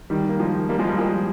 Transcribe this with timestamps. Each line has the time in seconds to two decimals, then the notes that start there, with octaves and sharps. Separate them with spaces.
0.10 D#3 G3
0.29 A#3
0.40 F3 G#3
0.69 G3 A#3
0.79 F3 G#3
0.89 G3 A#3
0.98 F3 G#3